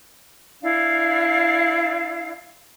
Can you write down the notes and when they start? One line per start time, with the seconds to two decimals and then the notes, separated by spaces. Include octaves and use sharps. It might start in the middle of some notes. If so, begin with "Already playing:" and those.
0.62 D4 E4 F5